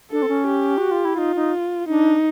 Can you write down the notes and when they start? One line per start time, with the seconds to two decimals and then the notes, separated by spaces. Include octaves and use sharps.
0.11 D4 A4
0.22 C4
0.29 C#4
0.48 G4
0.78 F#4
0.91 F4
1.05 E4
1.18 D#4 F4
1.36 D#4
1.89 D4 D#4